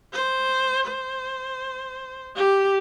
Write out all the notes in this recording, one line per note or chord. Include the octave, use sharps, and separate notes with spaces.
C5
C5
G4